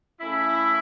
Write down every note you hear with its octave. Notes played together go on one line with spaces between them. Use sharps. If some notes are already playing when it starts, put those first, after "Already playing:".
C#3 A3 C#4 E4